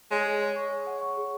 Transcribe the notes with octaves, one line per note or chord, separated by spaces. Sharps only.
G#3 C#5
G#4
C#5
C#6
C#5
F#5
C#6
G#4